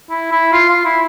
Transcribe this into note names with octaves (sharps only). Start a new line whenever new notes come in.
E4
E4
F4
F4
E4